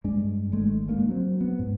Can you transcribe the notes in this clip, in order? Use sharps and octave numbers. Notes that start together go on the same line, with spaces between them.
G2 G#3 D4
G#1 G#3 A3
G#3 A#3 C#4 D4
F#3 C4
B3
G#2